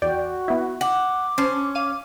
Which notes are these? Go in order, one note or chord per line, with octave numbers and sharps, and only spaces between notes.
E2 F#4 D5 G5
B3 E4
F#5 D6
C#4 C5 A5 C6
F5 D6 D#7